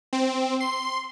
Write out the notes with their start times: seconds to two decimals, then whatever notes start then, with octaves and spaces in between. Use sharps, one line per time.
0.13 C4
0.60 C6